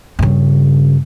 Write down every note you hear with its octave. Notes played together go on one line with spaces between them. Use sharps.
G2 C#3